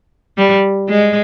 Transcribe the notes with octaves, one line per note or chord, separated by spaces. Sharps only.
G3
G#3